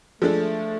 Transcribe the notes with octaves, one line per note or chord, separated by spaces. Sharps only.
F3 G#3 A3 D4 A4